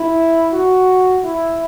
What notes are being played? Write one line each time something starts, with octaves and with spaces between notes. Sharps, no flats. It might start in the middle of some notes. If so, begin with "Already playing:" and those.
Already playing: E4
F#4
E4